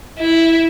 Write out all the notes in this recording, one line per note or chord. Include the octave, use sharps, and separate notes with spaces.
E4